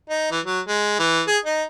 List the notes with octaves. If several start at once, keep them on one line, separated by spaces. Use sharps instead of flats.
D#4
E3
F#3
G#3
E3
G#4
D#4